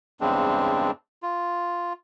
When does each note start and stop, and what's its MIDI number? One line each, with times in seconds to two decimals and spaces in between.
0.21 0.91 40
0.21 0.91 43
0.21 0.91 49
0.21 0.91 56
0.21 0.91 60
0.21 0.91 62
1.23 1.93 65